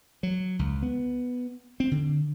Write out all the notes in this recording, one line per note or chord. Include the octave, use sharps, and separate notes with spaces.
F#3
C#2
B3
C4
D3